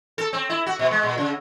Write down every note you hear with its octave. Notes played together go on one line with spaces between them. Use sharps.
A4
C4
E4
F#4
B2
G#3
A#2
C#3